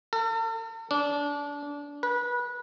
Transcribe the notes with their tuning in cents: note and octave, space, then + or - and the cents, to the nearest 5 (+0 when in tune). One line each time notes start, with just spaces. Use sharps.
A4 +45
D4 -25
B4 -25